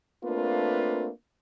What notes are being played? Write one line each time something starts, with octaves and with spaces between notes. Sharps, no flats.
A3 A#3 C4 D4 F4 B4